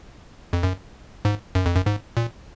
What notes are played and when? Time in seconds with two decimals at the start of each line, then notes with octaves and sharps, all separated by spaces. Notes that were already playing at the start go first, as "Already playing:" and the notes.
0.53 F2
0.63 F#2
1.25 G#2
1.55 F#2
1.66 F2
1.76 F#2
1.86 G#2
2.17 A#2